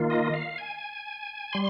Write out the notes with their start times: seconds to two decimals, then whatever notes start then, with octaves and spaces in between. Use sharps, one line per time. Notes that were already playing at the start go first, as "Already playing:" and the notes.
Already playing: D#3 A#3 F4
0.10 D#5
0.34 F5
0.58 G#5
1.53 G3 C6